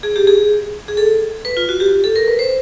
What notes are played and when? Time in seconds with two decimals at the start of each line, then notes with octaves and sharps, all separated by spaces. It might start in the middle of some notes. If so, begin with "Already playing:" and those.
0.03 G#4
0.16 G4
0.27 G#4
0.88 G#4
0.97 A4
1.45 B4
1.57 F4
1.69 F#4
1.80 G4
2.04 A4
2.16 A#4
2.28 B4
2.39 C5